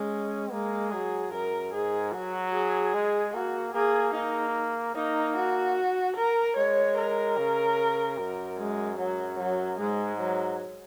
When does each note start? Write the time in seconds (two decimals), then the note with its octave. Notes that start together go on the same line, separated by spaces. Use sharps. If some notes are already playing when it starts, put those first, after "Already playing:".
Already playing: G#3 C#4
0.52 G#3 A#3
0.92 F#3 G#4
1.32 F#2 A#4
1.73 G#2 G#4
2.14 F#3 F#4
2.54 G#4
2.94 G#3
3.34 A#3 F#4
3.74 A#3 G#4
4.15 A#3 D#4
4.96 A#3 D#4
5.37 F#4
6.17 A#4
6.57 G#3 C#5
6.98 A#4
7.38 C#3
8.18 F#2
8.58 G#3
8.98 F#2 F#3
9.39 F#3
9.79 G#2 G#3
10.20 F#3